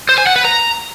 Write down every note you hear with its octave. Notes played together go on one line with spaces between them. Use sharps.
C5
G#5
F#5
B4
A#5